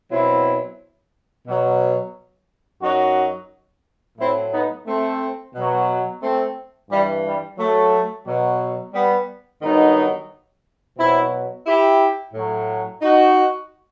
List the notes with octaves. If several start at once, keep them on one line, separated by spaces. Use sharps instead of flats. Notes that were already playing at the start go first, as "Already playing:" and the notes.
B2 F#3 C4 E4
B2 F#3
F#2 F#3 D#4 F#4
A2 F#3 C4 E4
B3 D#4
A3 C4
B2 F#3
A3 C4
G2 E3 G3
G3
F#3 A3
B2 F#3
G3 B3
G2 D#3 F#3 B3 D#4
B2 F#3 C4 E4
E4 G4
A2 F#3
D#4 F#4